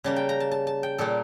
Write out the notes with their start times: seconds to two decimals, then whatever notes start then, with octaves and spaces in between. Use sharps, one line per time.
0.04 C#3 G3 A#3 A5
0.16 G5
0.29 A#5
0.40 A5
0.51 A5
0.67 A5
0.83 G5
0.98 A#2 G3 A#3 A4